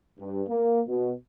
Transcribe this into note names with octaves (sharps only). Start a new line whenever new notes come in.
G2
A#3
B2